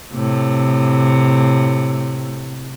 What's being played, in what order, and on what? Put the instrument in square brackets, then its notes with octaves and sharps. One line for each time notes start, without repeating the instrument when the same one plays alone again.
[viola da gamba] A2 C3